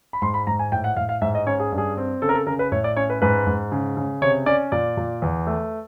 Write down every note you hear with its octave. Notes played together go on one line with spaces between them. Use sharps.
B5
G#2 C6
B5
G#2 A#5
G#5
A2 G5
F#5
A2 F5
F5
G#2 E5
D#5
C#4 C#5
G#4
G2
G#4
C4
C#3 A4
A#4
A4
C#3 A#4
B4
A2 C#5
D5
C#4 C#5
B4
G#2 B4
G#2
C#3
C#3
C3 C#5
C#4 D5
A#2 D5
A#2
E2
A3